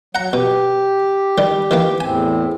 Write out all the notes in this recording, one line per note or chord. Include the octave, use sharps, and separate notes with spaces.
F#3 F#5 A#5
B2 G4
D#3 G3
D#3 E3 A#3
E2 A2 C4 G#5